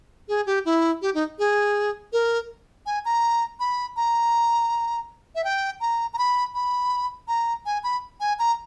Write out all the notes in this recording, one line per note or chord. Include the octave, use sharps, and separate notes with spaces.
G#4
G4
E4
G4
D#4
G#4
A#4
G#5
A#5
B5
A#5
E5
G5
A#5
A#5
B5
B5
A#5
G#5
B5
G#5
A#5